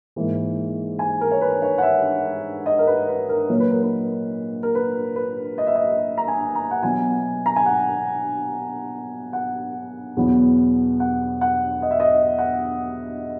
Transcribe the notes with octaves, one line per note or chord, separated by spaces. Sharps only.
G#2 E3 A#3
G#5
A#4
C#5
B4
C#5
F#5
E5
D#5
A#4
B4
B4
A#4
A#2 F#3 A#3 C#5
B4
A#4
B4
A#4
B4
B4
D#5
E5
D#5
A#5
G#5
A#5
F#5
B2 F#3 B3 G#5
A#5
G#5
F#5
F#5
E2 B2 F#3 B3
F#5
F#5
D#5
E5
D#5
F#5